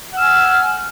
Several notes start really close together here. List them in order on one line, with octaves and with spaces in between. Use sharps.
F#5 E6 F6 G#5